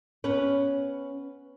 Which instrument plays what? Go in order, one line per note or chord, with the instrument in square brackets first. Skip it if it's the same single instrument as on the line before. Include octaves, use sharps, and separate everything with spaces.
[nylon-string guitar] B3 C#4 B4